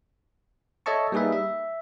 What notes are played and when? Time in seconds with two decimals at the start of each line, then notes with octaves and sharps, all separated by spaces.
0.86 A4 C#5 D#5 E5 A5 C#6
1.12 G3 A#3 D#4 G#4 B4 E5
1.32 E5